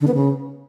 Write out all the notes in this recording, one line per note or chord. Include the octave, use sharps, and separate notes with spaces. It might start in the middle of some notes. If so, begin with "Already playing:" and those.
D3
B3
C#3